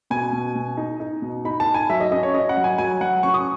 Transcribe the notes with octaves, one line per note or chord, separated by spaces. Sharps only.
B2 G#5
B2
B2
D#4
D#4
B2
D#4 B5
A5
D#4
G#5
F#3 E5
D#5
C#4 D#5
C#5
C#4 D#5
F#5
F#3
G#5
F#3 G#5
F#3 F#5
C#4 C#6
D#6